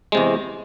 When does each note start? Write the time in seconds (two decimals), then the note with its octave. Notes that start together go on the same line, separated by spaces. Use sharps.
0.12 G#3
0.15 C3
0.17 E2